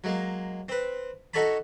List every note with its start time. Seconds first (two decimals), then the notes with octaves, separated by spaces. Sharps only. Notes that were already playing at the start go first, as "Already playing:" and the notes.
0.04 F#3 G#3 A#3
0.69 C4 B4
1.34 D#4 F#4 A4 C#5 A5 B5